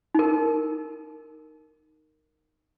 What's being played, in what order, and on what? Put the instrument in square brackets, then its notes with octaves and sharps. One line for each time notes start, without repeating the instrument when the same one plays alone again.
[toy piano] D#4 A#4